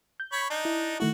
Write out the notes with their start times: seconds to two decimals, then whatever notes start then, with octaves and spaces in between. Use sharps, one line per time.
0.20 G6
0.32 C#5 B5
0.50 D4 D#4
0.65 E4
1.00 D#3 A3 E4 F#4